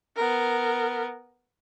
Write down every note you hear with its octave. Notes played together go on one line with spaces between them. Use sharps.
B3 A#4